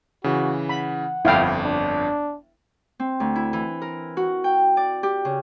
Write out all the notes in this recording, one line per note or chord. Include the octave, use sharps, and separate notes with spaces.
C#3 E3 F#4
F#5 B5
G1 F2 E4 F5 G5
D4
C4
D2
E4
E3
A#4
F#4
G5
D5
G4
C#3